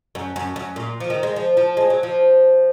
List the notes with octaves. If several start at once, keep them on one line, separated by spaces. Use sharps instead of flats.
F#2
F#2
F#2
A#2
F3
D#3
G#3
F3
F3
G#3
F#3
F3